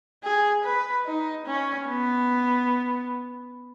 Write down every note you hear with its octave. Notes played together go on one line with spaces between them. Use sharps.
G#4
B4
D#4
C#4
B3